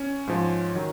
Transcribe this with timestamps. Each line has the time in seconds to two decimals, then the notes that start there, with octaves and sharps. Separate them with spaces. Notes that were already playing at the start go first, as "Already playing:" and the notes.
Already playing: C#4
0.27 G#2 F3
0.75 D#3 F#3